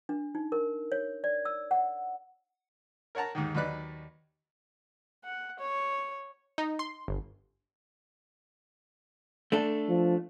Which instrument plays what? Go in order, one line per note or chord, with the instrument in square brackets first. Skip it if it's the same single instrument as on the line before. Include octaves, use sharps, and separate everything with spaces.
[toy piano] D4
D#4
A#4
C#5
D5
E6
F#5
[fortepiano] A#4 C#5 F#5 A5 A#5
D#2 G#2 D#3
D#2 F#3 D#4 B4 D5 F#6
[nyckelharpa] F#5
C#5
[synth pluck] D#4
C6
G1
[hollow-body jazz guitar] A3 D4 A4
[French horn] F3